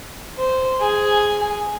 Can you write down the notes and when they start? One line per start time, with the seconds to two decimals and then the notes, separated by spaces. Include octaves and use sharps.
0.37 C5
0.81 G#4